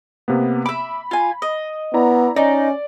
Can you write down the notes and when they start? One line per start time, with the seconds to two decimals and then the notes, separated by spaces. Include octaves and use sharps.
0.28 C3 A#3 B3
0.66 E5 B5 D6
1.11 F4 G#5
1.42 D#5
1.94 B3 E4 D5 A#5
2.36 C#4 D#4 D5